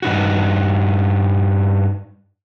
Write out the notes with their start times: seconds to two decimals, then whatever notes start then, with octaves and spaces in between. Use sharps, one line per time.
0.02 G2 D#4 F#4